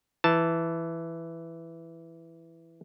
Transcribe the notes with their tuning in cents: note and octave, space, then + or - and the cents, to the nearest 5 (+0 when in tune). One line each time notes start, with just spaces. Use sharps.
E3 +5 A5 +0